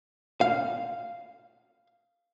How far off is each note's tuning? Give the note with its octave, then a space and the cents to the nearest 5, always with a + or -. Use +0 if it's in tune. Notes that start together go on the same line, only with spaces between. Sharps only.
F5 -5